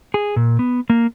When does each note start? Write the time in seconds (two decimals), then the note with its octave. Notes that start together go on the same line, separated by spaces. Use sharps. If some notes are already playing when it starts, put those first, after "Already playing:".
0.14 G#4
0.36 A#2
0.59 B3
0.90 A#3